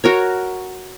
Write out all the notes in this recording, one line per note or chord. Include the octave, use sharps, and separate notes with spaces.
F#4 A#4 C#5